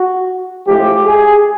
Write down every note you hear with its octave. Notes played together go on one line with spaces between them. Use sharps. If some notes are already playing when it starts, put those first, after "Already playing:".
Already playing: F#4
A1 A2 F3 G#3 G4
G#4